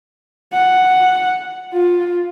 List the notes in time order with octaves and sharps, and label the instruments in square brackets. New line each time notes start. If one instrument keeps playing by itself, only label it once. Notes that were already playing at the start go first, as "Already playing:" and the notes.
[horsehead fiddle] F#5
F4